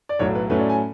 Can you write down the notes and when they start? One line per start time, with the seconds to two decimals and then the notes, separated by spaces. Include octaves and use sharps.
0.09 D5
0.19 B1 A2 F#3 C#5
0.35 B4
0.50 A2 F#3 A3 C#4 B4
0.60 D5
0.70 G#5